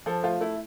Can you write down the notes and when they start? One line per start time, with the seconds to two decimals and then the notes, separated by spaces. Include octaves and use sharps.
0.06 F3 A4
0.23 A3 F4
0.41 A3 E4